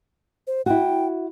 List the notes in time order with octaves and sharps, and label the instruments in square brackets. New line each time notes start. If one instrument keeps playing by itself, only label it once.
[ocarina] C5
[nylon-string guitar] E4 F#4 [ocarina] G5